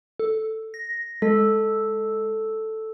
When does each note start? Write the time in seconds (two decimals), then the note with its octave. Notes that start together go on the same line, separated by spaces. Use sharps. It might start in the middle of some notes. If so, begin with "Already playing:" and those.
0.20 A4
0.74 A#6
1.22 G#3 A4